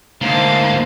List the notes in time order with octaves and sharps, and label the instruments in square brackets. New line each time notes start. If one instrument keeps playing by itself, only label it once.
[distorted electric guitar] D2 A#3 [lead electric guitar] G#2 [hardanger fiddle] C5 A5 [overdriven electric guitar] F5